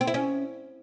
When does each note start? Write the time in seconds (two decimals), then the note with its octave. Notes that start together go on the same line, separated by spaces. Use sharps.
0.01 C4
0.07 E4
0.14 C#4